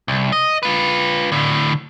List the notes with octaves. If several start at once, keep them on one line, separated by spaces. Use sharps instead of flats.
C2
D#5
F4 B4
A2 D3